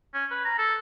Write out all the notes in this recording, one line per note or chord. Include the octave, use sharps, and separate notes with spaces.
C#4
B4
A#5
A4